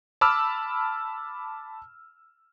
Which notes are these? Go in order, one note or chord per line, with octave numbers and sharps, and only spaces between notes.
A5 B5 D6 E6 F6